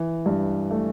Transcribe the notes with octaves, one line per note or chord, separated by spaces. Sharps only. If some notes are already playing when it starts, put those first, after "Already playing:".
Already playing: E3
G2
A3